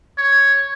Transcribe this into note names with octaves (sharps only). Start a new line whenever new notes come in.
C#5